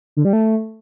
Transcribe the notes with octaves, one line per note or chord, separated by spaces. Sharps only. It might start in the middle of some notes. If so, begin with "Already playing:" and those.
D3
G3
A3